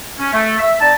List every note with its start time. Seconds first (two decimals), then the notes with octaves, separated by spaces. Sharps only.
0.19 C#4
0.33 A3
0.59 E5
0.80 C4 D#4 D5 A5